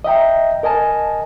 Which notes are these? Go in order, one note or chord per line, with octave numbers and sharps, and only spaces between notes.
D#5 E5 G5 A#5
A#4 D#5 G#5 A5